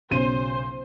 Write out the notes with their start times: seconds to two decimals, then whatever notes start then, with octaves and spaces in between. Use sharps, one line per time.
0.11 B1 C#3 C5 D#7